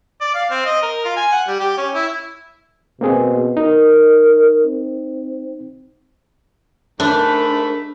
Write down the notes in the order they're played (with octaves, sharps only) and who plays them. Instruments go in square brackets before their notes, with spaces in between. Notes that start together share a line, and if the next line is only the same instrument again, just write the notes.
[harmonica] D5
F5
C4
D#5
A#4
F4
G#5
F#5
G3
G4
C#4
E4
[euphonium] B2 [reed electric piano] A#3 C4 G#4
[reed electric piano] D#4 [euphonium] A#4
[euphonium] C4
[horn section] G#2 A3 B5 [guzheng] D4 [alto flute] A#4